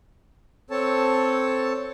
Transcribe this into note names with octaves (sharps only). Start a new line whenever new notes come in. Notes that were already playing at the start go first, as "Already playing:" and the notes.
C4 A4 C#5 A5